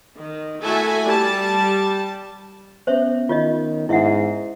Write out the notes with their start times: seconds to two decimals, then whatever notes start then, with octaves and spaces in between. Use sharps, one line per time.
0.17 D#3
0.63 A3 E4 F#4 A4 E5 G#5
1.05 G3 A5
2.87 B3 C#4 C5 C#5 E5
3.29 D#3 F4 C#5 D#5
3.89 G#2 E4 E5 F#5